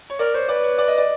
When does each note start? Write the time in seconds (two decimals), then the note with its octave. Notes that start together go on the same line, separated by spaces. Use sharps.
0.10 C#5
0.19 A#4 D5
0.34 C5 C#5
0.49 B4 D5
0.64 C#5
0.78 D5
0.88 D#5
0.98 D5